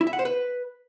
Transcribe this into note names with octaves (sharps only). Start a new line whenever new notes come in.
E4
E5
F#5
C5
B4